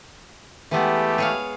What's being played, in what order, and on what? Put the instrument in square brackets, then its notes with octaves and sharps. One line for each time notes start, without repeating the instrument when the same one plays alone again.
[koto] E3 G#3 B3 [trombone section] A3 G4
[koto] G#4 C#5 F5